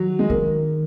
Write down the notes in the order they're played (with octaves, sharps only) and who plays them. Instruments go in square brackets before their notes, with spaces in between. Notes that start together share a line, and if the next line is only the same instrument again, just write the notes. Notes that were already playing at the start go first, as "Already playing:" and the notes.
Already playing: [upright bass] D#3 [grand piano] F#3
[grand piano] G#3
[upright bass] D#3 [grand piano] A#3